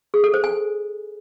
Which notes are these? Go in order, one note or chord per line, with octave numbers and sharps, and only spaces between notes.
G#4
A4
C5
G#5